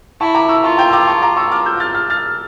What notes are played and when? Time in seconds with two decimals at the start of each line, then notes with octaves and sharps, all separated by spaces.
0.20 E4 A5 C#6
0.35 A#5 D6
0.49 C#6 E6
0.64 F4 A5 C#6
0.78 G5 A#5
0.89 E6
0.93 A#5 D6
1.07 A5 C#6
1.22 A#5 D6
1.37 C#6 E6
1.52 D6 F6
1.66 E6 G6
1.80 F6 A6
1.94 F6 A6
2.10 F6 A6